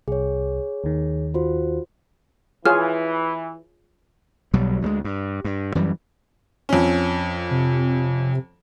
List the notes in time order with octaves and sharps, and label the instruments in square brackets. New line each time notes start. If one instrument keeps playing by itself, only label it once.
[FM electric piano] C2 [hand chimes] G#4 C#5
[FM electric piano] D#2 D#3
[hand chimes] F4 F#4 C5
[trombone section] E3 [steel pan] F4 G#4 C#5 [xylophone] F6
[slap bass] B1 B2 F#3 G3
D2 G3 G#3
G2
G2
F#2 E3 G3
[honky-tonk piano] F2 C#4
[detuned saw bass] C3